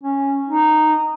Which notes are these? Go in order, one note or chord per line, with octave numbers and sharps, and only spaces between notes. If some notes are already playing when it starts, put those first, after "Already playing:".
C#4
D#4